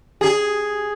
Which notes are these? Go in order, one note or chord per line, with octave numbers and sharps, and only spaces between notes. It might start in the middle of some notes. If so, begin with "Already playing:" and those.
G#4